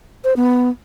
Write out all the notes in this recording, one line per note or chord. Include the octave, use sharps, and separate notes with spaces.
C5
B3